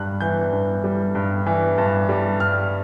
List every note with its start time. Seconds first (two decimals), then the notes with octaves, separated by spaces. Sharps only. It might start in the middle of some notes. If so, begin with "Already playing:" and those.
Already playing: G2 G3 F#6
0.20 E3 G6
0.52 G2
0.84 G3
1.15 G2
1.46 E3
1.78 G2
2.09 G3
2.40 G2 F6